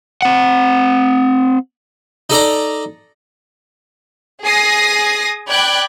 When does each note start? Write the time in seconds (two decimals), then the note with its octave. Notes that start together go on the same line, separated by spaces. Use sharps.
0.22 C4 F#5
2.30 D#4 A4 D5 A#5
4.43 G#4 G#5 D#6 A#6 C7
5.49 D5 G5 B5 D6 F#6 G#6